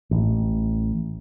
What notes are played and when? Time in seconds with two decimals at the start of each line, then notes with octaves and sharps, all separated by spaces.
0.11 A1